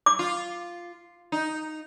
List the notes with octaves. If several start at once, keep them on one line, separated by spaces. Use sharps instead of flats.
D6
F4
D#4